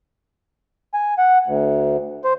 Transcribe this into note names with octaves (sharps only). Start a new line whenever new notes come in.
G#5
F#5
D2
C5